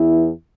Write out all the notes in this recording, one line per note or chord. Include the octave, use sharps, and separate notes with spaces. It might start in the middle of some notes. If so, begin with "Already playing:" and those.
Already playing: E2 E3 E4